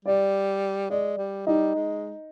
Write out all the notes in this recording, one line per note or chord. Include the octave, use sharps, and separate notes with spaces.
G3 D5
G#3 D5
G3
G3 D#4
G#3